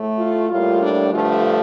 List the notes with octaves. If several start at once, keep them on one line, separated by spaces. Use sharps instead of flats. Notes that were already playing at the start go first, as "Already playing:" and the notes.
Already playing: A2 A3
F4
A2 G3 A#3 F4
D4
G2 D3 F3 A3 F4